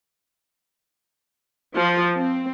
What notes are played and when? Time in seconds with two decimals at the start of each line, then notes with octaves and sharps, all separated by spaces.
1.76 F3
2.17 C4